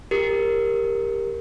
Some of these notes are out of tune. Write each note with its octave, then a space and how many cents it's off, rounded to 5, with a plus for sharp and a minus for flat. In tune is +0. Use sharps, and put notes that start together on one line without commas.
G4 +20 A#4 +0